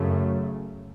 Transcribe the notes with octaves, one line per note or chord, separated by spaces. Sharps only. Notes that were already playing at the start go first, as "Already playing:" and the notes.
Already playing: F#2 C#3 A3